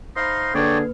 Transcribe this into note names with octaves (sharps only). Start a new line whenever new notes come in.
D#4 C5 E5 F5 B5 C6
D3 A#3 G#4 B4 C#5 D5 G5